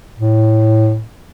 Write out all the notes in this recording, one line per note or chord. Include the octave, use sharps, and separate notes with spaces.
A2